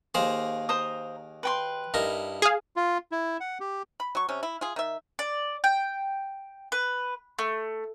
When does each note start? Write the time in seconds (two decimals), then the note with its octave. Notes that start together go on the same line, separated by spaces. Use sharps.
0.14 D#2 A#3 G#4 C5
0.69 C5 A#5 D#6
1.43 B4 G5 C6
1.94 G2 D#4 E4 A#4
2.42 G#4 F5
2.76 F4
3.12 E4
3.40 F#5
3.60 G4
4.00 B5
4.15 F#3 C#6
4.29 C3 C#4
4.43 E4
4.61 F4 G#4
4.76 D#3 E5
5.19 D5
5.64 G5
6.72 B4
7.39 A3